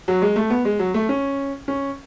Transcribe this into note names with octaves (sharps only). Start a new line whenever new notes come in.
F#3
G#3
A3
B3
G#3
F#3
A3
C#4
C#4